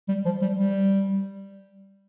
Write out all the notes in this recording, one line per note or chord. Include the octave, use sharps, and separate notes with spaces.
G3
F3
G3
G3